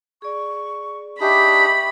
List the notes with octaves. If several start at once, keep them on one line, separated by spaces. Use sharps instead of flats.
G#4 D5 C#6
D4 D#4 G4 G#4 E5 G5 B5 C#6